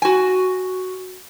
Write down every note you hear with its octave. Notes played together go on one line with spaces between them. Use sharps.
F#4 G#5